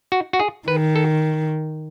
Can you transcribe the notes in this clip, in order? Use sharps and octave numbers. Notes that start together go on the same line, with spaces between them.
F#4
F#4
G#4
D#3 B4
A4